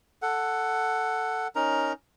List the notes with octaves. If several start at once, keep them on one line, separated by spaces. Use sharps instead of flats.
A4 F#5
C#4 D#4 A#4 A#5